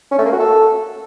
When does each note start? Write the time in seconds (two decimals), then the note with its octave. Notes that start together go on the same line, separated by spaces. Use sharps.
0.11 C#4
0.18 A3
0.25 A#3
0.32 F#4
0.39 A4